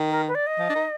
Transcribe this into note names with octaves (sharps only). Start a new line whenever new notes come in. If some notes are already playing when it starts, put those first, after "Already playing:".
Already playing: D#3
A#4
B4
D5
D#5
F3
D4
D#4